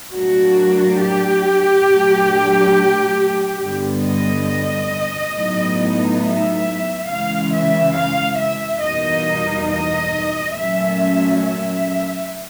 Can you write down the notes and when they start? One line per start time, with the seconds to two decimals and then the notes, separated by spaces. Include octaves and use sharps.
0.13 A2 F#3 A#3 D4 F#4
1.00 G4
1.87 A#2 F#3 A3 D4
3.60 G2 D3 G3 B3
4.04 D#5
5.34 A2 F#3 B3 D#4
6.21 E5
7.07 C#3 E3 G#3 F5
7.51 E5
7.94 F5
8.38 E5
8.81 E2 B2 G3 A#3 D#4 D#5
9.68 D#5
10.55 A#2 F#3 A3 C#4 E5
11.42 E5